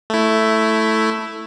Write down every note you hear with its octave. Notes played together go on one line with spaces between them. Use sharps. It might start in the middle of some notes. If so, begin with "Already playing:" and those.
A3 E4